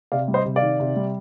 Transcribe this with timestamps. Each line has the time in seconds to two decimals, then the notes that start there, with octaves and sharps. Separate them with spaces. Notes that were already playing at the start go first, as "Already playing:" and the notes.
0.12 C3 D5 F5
0.28 G3
0.34 C5 D#5
0.45 C3
0.56 D5 F5
0.62 D#3
0.80 C3
0.96 G3